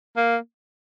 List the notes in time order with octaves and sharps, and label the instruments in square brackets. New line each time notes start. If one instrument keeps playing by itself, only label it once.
[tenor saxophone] A#3